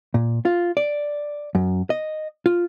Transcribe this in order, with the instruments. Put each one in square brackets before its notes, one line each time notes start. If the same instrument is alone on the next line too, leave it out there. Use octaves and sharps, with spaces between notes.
[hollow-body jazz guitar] A#2
F4
D5
F#2
D#5
F4